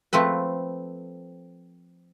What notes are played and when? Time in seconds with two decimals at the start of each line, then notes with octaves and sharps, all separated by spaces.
0.13 F3 A3 C4 B4